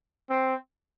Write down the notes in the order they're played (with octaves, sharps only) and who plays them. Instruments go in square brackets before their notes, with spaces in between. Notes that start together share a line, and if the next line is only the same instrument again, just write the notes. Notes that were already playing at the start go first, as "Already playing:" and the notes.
[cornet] C4